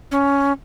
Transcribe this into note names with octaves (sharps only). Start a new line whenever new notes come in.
C#4